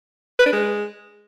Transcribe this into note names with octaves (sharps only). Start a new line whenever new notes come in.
B4
D4
G#3